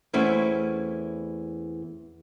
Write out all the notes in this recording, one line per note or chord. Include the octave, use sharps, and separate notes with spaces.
E2 A3 C4 C#4 E4